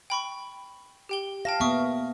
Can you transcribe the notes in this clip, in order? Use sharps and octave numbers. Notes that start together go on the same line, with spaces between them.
G5 B5 C#6
G4 G5 G7
F5 G5 A5 A#6
A#3 B3 E5 C#6 D#6